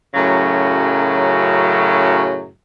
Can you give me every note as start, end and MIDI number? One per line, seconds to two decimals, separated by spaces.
0.15 2.49 42
0.15 2.49 45
0.15 2.49 49
0.15 2.49 54